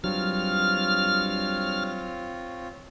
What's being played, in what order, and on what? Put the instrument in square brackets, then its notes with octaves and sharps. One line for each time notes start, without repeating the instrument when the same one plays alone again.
[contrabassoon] G2 [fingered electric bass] F#3 [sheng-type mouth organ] C4 F4 C#5 [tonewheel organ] F6